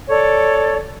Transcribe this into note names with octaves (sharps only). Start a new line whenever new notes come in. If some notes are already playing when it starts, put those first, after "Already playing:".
A4 C#5 D5